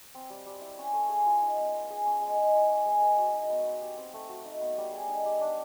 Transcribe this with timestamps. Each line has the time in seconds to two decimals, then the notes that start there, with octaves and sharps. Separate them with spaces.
0.15 C4
0.30 G3
0.46 G3
0.61 E4
0.78 C#4
0.93 A3
1.09 G#4
1.26 F4
1.42 D#4
1.57 B3
1.74 B3
1.90 G#4
2.06 C#4
2.21 G#3
2.38 G#3
2.54 E4
2.69 C#4
2.86 G#3
3.02 A#4
3.17 F#4
3.33 D#4
3.50 B3
3.66 B3
3.81 G4
3.97 C4
4.14 A3
4.29 F#4
4.45 D#4
4.61 B3
4.78 G3
4.93 G#4
5.08 D#4
5.25 G4
5.41 D4